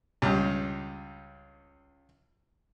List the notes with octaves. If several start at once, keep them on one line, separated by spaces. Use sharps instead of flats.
C#2 G2